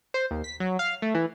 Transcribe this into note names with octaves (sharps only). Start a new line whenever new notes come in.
C5
D#2
B6
F#3
F5
A3
E3